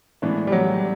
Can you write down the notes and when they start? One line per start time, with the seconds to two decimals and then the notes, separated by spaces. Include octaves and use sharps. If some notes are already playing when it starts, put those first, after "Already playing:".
0.22 A2 E3 G#3 B3 D4
0.47 G3
0.52 F#3